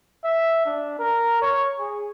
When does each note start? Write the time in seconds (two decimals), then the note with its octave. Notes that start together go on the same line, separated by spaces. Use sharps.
0.24 E5
0.66 D4
0.98 A#4
1.42 C#5
1.79 G#4